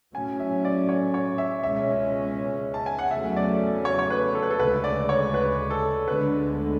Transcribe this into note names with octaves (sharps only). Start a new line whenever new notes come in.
A2 F#3 C#4 G#5
E5
D5
C#5
C#5
E5
C#2 B2 G#3 C#4 E5
A5
G#5
F#5
E2 C#3 F#3 A3 C#4 E5
D5
C#5
C#5
B4
A4
B4
A4
D2 C#3 G#3 B4
D5
C#5
B4
A4
D2 D3 G#3 B3 B4